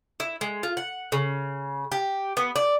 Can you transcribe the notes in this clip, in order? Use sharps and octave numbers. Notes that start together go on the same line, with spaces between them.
E4
G#3
F4
F#5
C#3
G4
B3
D5